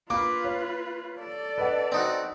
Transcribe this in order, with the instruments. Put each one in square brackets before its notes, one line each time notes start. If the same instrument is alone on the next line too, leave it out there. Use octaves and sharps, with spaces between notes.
[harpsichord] A#3 [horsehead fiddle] F4 B4 [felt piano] B5 D6
[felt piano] C#5
[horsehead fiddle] A4 D5
[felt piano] B4 D#5 F#5
[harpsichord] C4 D#4 F#4